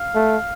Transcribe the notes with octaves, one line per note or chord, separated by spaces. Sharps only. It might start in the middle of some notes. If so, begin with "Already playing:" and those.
Already playing: F5
A3